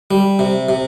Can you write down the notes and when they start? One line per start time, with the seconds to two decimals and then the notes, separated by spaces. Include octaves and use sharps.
0.11 G3
0.39 C3
0.69 C3